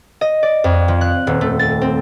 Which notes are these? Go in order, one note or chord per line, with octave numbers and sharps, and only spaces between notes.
D#5
D5
F2
F3
F#6
D#1
A3
A6
C4